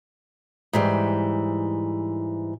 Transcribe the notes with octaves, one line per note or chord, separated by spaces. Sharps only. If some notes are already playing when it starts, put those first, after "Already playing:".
G#2 E3 G3